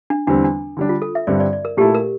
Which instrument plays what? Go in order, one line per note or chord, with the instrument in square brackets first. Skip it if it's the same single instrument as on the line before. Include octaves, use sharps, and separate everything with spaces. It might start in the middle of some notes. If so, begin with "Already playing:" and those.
[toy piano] D4
[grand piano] E2 D3 G3 C4 [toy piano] D4
[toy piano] D4
[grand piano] D3 G3 D4
[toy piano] F4
A4
E5
[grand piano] G2 D3 G3 C4 [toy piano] D5
[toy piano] D5
D5
A#4
[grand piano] A#2 A3 E4 A4 [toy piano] G4
[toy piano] A#4